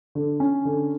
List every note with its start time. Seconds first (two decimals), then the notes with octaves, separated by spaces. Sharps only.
0.15 D3
0.40 C#4
0.65 D3